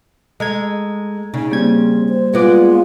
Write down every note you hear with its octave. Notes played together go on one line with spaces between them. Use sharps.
G#3 A4 A#5 G#6
C#3 D#4
G3 A#3 C4 G#6
C5
G#3 B3 F4 B4 D5